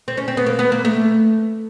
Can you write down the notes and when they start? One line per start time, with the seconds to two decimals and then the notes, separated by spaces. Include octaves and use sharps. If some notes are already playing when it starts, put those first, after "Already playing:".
0.08 C4
0.17 C#4
0.28 C4
0.37 B3
0.46 A#3
0.59 B3
0.72 A#3
0.85 A3